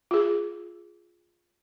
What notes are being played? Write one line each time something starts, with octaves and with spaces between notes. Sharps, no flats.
F4 G#4